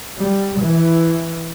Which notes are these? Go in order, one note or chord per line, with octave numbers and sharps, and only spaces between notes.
G3
E3